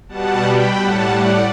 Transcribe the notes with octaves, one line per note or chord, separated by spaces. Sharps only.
B2 G3 F#5 A5
G5 B5
A2 G3 F#5 A5
D5 F#5